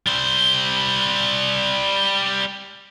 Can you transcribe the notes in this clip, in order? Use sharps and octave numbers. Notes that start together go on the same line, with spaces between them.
G3 C5